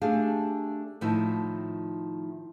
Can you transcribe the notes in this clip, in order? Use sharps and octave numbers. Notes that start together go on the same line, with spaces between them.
A3 D4 G4 G#4 F5
A2 D#3 F3 D#4 E4